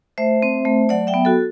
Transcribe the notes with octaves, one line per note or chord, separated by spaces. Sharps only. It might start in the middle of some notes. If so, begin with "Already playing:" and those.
A3 C5 E5
C4
A3
F#3 D5 F#5
E5 G5
B3
F#4 A4